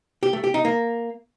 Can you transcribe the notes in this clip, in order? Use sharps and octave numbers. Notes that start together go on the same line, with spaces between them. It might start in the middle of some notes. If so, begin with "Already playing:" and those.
G4
A3
G4
D#4
A#3